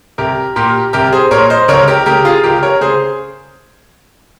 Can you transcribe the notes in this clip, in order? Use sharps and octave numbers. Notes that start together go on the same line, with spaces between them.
C2 G4 A#4
A#2 G4 A#4
C2 G4 A#4
G#4 C5
A#2 A#4 C#5
C5 D#5
C#2 A#4 C#5
G4 A#4
C#3 G4 A#4
F4 G#4
C#2 G4 A#4
A#4 C#5
C#3 G#4 C5